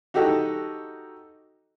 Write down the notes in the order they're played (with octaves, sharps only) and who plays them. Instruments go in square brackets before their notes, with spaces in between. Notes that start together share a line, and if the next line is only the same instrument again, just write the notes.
[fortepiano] D#4 F#4 G4 A4 D#5